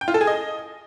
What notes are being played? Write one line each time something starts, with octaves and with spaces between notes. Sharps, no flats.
G5
F4
A4
G#4
D#5